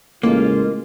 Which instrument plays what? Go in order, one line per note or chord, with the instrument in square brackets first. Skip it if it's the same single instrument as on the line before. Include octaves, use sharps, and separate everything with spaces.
[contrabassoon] A1 [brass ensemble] C#3 G#3 F4 [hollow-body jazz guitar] A#3